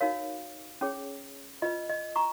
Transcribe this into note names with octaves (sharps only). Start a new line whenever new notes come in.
D#4 F#4 A#4 C#5 F5
C#4 G#4 C#5
F4 B4 D#5
D#5
A#5 C#6